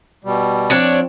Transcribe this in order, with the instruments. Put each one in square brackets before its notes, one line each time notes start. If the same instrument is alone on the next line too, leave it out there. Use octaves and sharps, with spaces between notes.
[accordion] B2 G3
[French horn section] F3 C4 [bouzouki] D4 C#5 D5